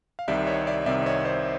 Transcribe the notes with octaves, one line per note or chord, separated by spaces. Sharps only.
F5
C2 C3 D#3 D5 E5
C#5 D#5
D5 E5
C2 C3 D#3 D5 E5
C#5 D#5
C5 D5